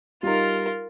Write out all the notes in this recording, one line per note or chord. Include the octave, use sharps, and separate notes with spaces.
G3 D#4 F4 A#4